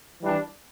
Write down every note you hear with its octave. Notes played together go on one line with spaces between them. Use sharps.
E3 G3 D4